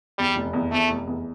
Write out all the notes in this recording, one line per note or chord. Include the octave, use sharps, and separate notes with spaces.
E2 G3
F1
E2
E2 A3
F1
E2